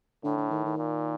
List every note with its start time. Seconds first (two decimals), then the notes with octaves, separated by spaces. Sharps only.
0.24 A2 D3
0.38 D3
0.51 D#3
0.64 D#3
0.78 A#2